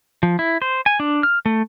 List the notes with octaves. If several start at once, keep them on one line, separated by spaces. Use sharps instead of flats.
F3
E4
C5
G#5
D4
F6
A3